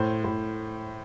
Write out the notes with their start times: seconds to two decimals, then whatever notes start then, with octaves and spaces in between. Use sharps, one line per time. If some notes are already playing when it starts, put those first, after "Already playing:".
Already playing: A2 C5
0.24 A2